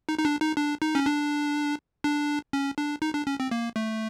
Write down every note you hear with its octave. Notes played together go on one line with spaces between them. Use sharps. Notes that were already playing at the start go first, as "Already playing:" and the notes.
D#4
D#4
D4
D#4
D4
D#4
C#4
D4
D4
C#4
D4
D#4
D4
C#4
C4
A#3
A3